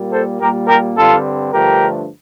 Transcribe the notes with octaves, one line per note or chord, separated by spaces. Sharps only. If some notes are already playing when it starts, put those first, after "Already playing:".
Already playing: A#2 G3 A#3
A4 C5
A#2 G3 A#3 G4 A#4
G4 A#4
G2 D3 G3 C4 F4 A4
G2 D3 F3 A3 G4 A#4